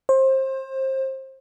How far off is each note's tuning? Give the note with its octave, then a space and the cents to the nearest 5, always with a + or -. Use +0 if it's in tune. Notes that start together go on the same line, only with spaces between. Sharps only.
C5 +25